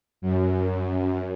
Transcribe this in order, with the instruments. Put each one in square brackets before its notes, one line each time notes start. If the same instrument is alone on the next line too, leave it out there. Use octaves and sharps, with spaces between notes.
[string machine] F#2